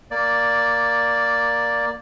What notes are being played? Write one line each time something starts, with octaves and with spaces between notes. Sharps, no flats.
A#3 D5